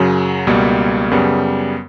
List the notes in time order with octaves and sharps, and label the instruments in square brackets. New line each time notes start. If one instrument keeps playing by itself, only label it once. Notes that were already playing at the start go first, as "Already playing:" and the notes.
Already playing: [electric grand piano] F#2 C#3 F#3
C#2 B2 G3 A#3
F#2 C#3 G3 B3